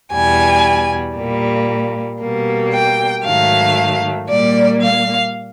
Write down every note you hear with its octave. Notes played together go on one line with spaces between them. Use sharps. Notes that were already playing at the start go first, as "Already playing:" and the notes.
E2 B2 G3 G#5
A#2 G3 A#3
B2 G3 A#3
G5
G#2 D#3 F#3 A3 F5
A#2 G3 A#3 D5
F5